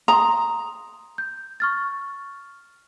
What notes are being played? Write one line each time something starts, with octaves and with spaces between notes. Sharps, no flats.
A#5 C6 D#6
G6
C#6 F6 A6